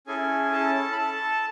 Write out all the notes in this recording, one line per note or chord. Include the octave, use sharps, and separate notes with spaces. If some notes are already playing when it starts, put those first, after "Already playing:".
C#4 E4 G#4 A4 G#5
A4 A5
B5
A4 A5